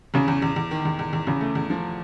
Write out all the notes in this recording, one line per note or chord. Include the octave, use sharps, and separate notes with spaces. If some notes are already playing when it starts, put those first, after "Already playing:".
E2 C#3
E2
E2
E2
D#3
E2
E2
E2
E2 C#3
A3
E2
F3